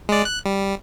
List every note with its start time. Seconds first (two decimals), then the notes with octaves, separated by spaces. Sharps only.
0.09 G#3 D5
0.25 F#6
0.46 G3